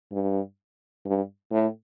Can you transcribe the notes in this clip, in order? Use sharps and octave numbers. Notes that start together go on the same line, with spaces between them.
G2
G2
A2